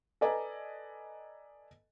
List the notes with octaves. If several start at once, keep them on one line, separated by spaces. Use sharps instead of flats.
A4 B4 D5 D#5 G#5 A#5